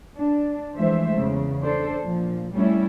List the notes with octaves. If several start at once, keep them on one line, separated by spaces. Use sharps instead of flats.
D4
E3 F3 G#3 A3 C5 E5
E2 C#3
D4 A4 C5
A#2 F3
G3 A3 C#4 E4